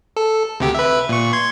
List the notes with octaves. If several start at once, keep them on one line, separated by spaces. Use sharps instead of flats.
A4
D2 C3 G4
B4 E5
A#2 C#6
C6 G#6